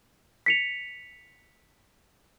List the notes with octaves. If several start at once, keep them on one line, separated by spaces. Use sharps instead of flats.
B6 C#7 F7